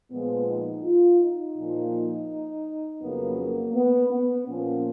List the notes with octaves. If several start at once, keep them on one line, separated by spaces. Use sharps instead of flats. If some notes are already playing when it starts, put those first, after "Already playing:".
A#2 F3 G#3 B3
D#4
F4
D#4
A#2 F3 A#3
F2 C#3 F#3 A#3 B3
A#3
B3
B3
A#2 F3 A#3 C#4